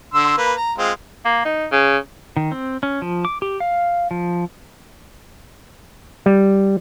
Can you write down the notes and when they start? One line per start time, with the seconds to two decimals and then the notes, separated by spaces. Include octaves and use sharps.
0.14 D3 C6 E6
0.38 A#3 B4
0.57 A#5
0.78 G#3 C4 F4
1.25 A#3
1.45 D#4
1.72 C#3
2.37 D#3
2.52 C4
2.83 C#4
3.02 F3
3.25 D6
3.42 G4
3.60 F5
4.11 F3
6.26 G3